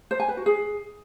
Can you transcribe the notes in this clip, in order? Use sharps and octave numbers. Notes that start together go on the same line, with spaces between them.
C5
G#5
B4
F#4
G#4